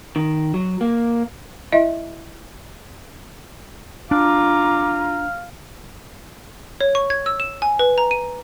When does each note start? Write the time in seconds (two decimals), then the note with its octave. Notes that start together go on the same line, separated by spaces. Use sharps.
0.16 D#3
0.54 F#3
0.81 A#3
1.72 E4 D#5 E5
4.11 D4 F4 F5 A#5 D6
6.81 C#5
6.95 C#6
7.10 G#6
7.26 E6
7.40 E7
7.62 G#5
7.79 B4
7.98 A#5
8.11 D#7